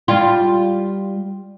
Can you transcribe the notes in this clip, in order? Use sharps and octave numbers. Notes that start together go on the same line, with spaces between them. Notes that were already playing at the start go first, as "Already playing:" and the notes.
G3 F4